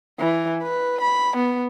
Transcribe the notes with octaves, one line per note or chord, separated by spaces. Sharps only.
E3
B4
B5
B3